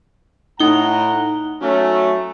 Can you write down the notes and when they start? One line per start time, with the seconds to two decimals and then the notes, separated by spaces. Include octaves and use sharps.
0.60 A2 D#4 F#5 A#5 G7
1.61 F#3 A3 C#4